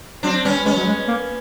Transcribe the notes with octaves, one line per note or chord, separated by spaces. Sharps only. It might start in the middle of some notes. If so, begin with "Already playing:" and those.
F#3 C4 D4
G3 B3 C#4
G#3 B3 C#4
F#3
G#3
A#3